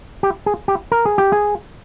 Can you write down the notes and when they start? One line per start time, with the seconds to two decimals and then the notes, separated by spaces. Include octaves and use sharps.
0.23 G4
0.46 G#4
0.68 G4
0.92 A#4
1.05 G#4
1.18 G4
1.32 G#4